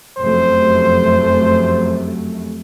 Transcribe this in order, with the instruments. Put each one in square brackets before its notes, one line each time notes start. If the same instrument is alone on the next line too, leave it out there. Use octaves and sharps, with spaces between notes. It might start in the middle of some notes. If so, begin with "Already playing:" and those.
[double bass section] F1 F#2 A3 [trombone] C5